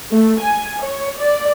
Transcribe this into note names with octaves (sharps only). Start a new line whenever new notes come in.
A3
G#5
C#5
D5